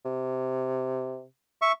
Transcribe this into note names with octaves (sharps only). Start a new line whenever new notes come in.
C3
E5 C#6